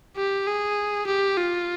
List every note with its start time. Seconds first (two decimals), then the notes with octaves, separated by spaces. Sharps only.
0.17 G4
0.47 G#4
1.07 G4
1.37 F4